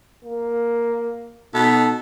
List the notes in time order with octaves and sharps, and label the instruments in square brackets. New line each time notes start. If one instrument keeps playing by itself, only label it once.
[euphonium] A#3
[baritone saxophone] B2 [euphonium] D#4 [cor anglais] A4